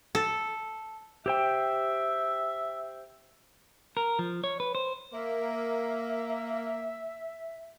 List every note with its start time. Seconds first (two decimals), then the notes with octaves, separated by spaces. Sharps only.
0.15 A4
1.26 G4 C5 E5 G5
3.97 A#4
4.19 F3
4.44 C#5
4.60 B4
4.75 C5
5.13 A#3 E5